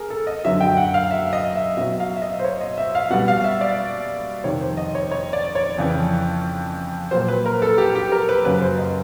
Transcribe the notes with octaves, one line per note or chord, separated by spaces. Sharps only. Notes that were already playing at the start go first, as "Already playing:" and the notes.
Already playing: G#4 A#4
A4
D#5
F#2 D3 F#3 E5
G5
F#5
F5
E5
D#5
E5
B2 F#3 E5
F5
E5
D#5
C5
C#5
D#5
E5
F5
B2 G3 F#5
F5
E5
D5
F2 C3 D#3 C#5
C5
D#5
C#5
C#5
D5
C#5
F2 C#3 E3
A#2 F#3 C5
B4
A#4
A4
G4
G4
A#4
B4
F#2 C#3 F#3 B4
C5
D#5